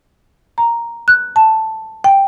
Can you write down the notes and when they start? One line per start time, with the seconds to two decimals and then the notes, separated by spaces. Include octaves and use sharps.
0.58 A#5
1.08 F#6
1.36 A5
2.04 G5